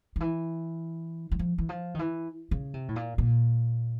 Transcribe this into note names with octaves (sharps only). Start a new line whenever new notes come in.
D#3
E3
F#3
F3
E3
F3
D#3
E3
C#3
C3
A2
A#2
A#2